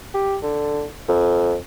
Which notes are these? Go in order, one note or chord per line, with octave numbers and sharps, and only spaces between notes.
G4
D3
F2